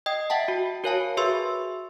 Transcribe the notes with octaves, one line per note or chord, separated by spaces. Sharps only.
D#5 G5 D#6
E5 F#5 G5 A5
F#4
F#4 A#4 C#5 F5 G#5 A5
F#4 G#4 B4 E5 C6 E6